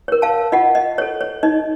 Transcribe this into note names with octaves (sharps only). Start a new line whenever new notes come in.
A#4 C#5
F5 A5
F4 D#5 F#5
D#5
C#5
A4
C#5
D#4 D#5